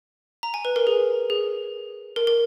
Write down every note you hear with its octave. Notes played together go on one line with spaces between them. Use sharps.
A#5
G#5
B4
A#4
G#4
G#4
A#4
A#4